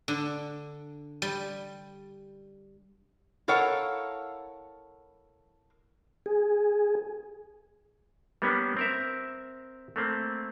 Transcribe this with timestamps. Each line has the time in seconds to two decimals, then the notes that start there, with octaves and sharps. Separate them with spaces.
0.08 D3
1.22 G3
3.48 E4 A4 A#4 C#5 F5 F#5
6.26 G#4
8.42 G3 A#3 B3 C#4 D4
8.77 C4 A#4 E5
9.96 A3 A#3 C4